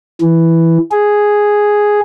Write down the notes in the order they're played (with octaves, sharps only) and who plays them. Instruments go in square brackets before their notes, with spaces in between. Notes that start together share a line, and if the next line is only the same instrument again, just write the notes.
[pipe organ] E3
G#4